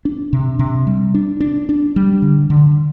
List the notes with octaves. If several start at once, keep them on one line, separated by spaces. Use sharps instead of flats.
D4
C3
C3
G3
D4
D4
D4
G3
D3
D3